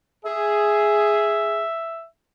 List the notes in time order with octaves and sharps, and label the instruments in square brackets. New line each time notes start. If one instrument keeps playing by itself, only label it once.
[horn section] G#4 [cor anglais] E5